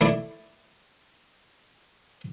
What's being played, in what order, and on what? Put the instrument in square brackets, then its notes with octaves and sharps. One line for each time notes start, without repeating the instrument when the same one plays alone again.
[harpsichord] A3 E4 D5